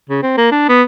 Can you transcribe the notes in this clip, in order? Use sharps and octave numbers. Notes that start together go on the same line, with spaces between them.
C#3
C4
A#3
D4
B3